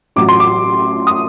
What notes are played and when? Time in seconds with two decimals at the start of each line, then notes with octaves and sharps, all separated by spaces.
0.16 A1 A2 F#3 D6
0.29 C6
0.40 D6
1.07 D#6